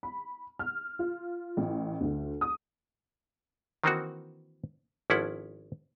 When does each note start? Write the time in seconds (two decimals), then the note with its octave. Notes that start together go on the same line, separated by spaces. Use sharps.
0.03 B5
0.59 F6
0.99 F4
1.57 A1
2.01 D2
2.41 D#6
3.84 D#3 E3 A#3 C4 D#4 F#4
5.10 G#1 F3 C#4 E4 A4 F#5